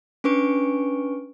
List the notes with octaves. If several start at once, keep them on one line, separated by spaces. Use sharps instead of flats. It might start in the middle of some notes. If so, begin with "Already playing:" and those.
C#4 D4 B4 C#6 D7